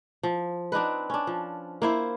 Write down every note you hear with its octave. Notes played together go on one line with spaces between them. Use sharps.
F3
C4 D4 D#4 B4
C#4 D4
F3
A#3 E4 C5